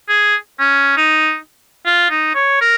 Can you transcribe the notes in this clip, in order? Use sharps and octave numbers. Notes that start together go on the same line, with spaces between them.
G#4
C#4
D#4
F4
D#4
C#5
A#4